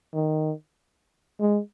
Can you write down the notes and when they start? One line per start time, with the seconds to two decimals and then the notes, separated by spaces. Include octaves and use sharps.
0.14 D#3
1.41 G#3